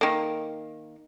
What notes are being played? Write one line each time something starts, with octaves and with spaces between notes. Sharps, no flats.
D#3 A#3